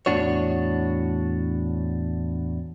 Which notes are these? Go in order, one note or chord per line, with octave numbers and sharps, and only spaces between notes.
E2 A2 D4 F#4 C#5